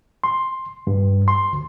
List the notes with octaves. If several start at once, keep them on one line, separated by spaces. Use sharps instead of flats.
C6
G2
C6
D2